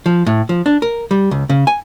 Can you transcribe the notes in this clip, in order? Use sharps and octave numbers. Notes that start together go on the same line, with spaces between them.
F3
A2
F3
D4
A#4
G3
C#2
C#3
G#5